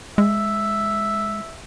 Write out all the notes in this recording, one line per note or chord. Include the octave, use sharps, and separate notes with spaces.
G#3 E5